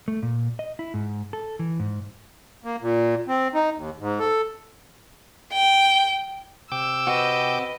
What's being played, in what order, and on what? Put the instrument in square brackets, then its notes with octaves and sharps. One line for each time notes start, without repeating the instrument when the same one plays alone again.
[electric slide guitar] A3
A#2
D#5
E4
G#2
A4
E3
G#2
[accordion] A#3
A#2
C4
D#4
D#2
G#2
A4
[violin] G5
[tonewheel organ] C3 G5 D6 [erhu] E6
[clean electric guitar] C4 F#4 [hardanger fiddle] B4 D#5